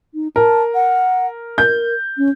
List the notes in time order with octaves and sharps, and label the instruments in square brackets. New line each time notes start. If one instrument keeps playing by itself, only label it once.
[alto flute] D#4
[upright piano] A#4 [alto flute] A5
[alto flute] F#5
[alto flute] A#4 [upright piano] G6
[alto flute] C#4